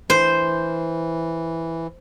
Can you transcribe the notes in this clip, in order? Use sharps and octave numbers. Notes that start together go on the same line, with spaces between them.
E3 C5